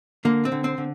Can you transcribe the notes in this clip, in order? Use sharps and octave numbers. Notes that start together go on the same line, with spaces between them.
D3 A#3
C4
D3
C4
D3